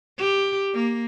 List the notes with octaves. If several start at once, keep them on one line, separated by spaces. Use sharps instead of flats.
G4
A#3